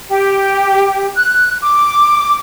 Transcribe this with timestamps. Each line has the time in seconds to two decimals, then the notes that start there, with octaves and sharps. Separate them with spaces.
0.09 G4
1.16 F#6
1.62 D6